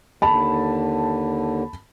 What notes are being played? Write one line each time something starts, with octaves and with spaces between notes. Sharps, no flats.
D#2 D3 A5 B5